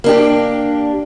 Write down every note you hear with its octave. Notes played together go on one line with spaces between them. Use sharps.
A#3 D4 G4